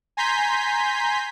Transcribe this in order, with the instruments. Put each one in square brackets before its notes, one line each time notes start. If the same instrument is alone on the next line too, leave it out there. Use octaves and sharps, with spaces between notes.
[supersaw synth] G#5 A#5 C6 G6 B6